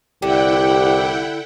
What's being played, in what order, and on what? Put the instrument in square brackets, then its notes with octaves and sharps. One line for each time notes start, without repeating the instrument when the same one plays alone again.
[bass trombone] C2 [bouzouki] D3 [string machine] E4 F#5 G5 [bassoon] G4